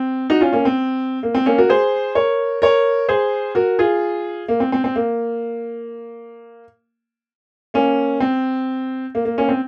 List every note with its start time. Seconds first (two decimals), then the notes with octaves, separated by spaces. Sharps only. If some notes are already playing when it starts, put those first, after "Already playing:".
Already playing: C4
0.30 D#4 F#4
0.41 C#4 F4
0.53 A#3 C#4
0.65 C4
1.23 A#3
1.35 C4
1.46 A#3 C#4
1.58 F#4 A#4
1.69 G#4 C5
2.15 A#4 C#5
2.62 A#4 C#5
3.09 G#4 C5
3.55 F#4 A#4
3.79 F4 G#4
4.48 A#3
4.60 C4
4.72 C4
4.84 C4
4.96 A#3
7.74 A#3 C#4
8.20 C4
9.15 A#3
9.25 A#3
9.38 A#3 C#4
9.49 C4